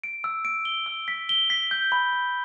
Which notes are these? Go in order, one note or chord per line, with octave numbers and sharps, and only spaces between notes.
D7
E6
D7
G7
E6
B6
G7
B6
G6
B5
B5